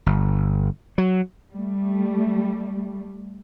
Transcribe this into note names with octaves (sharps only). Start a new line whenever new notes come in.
G1
F#3
G3 A3